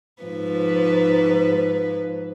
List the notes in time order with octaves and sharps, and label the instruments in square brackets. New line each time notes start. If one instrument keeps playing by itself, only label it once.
[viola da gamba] G#2 F3 B4